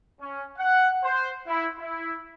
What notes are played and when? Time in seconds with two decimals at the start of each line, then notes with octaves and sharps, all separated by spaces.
0.20 C#4
0.58 F#5
1.03 C5
1.47 E4
1.79 E4